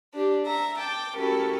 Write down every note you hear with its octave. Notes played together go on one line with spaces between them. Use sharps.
D4 G4
E5 A#5
G5 A5 D6
C#4 E4 F#4 G4 A4 A#4